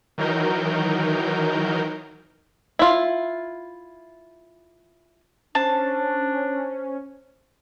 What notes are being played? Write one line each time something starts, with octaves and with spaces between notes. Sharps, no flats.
D#3 E3 F#3 D#4 A#4 G6
E4 F4
C#4 D4 C5 A5